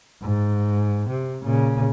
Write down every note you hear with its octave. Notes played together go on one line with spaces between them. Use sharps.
G#2
C3
A#2 C#3